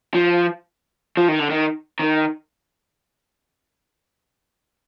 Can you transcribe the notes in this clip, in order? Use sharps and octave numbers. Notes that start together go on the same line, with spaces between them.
F3
F3
D#3
D3
D#3
D#3